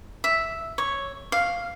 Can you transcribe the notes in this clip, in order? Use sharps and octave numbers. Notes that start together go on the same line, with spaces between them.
E5
C#5
F5